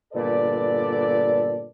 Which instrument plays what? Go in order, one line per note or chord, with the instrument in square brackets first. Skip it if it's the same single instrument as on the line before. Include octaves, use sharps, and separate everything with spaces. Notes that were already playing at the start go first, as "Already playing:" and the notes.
[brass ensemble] G1 A#2 A4 B4 D5